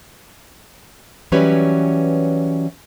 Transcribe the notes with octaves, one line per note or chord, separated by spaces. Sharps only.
E3 F#3 G3 C#4 B4 C#5